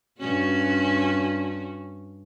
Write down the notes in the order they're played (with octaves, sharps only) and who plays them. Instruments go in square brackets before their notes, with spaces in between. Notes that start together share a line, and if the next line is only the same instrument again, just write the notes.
[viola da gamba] G2 C#4 F#4